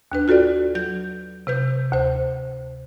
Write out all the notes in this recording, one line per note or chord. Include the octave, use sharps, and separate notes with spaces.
D#2 D4 B4
F4 F#4 A4 B4 D5
F#3 G6
C3 B4 G6
D2 C5